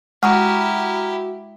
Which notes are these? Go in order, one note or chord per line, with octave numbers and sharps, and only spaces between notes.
G#3 E4 F#4 G4 A#5 D#6 F6